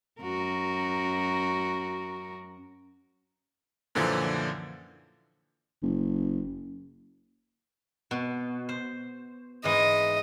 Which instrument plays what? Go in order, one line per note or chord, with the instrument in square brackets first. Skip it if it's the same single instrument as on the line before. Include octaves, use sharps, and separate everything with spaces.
[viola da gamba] F#2 F#4 A#4
[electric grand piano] F#2 A#2 D3 E3 F3
[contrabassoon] F#1
[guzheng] B2
C5
[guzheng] G#2 E3 [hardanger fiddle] D#5